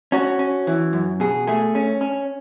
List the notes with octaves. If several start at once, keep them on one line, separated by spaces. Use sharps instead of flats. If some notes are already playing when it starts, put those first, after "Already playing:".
C#4 F#4
C#4
E3
F#2
B2 G#4
A3 G#4
C#4
C#4